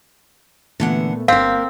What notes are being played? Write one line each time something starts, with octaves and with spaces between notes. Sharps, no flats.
A#2 D3 E3 A3 B3 F#5
G1 A#3 C4 A#4 F5 B6